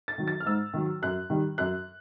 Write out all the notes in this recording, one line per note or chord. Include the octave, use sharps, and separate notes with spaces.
A6
D#3 F#3
A6
F6
G#2 E6
D#3 F#3
F#2 F#6
D#3 G3
F#2 F#6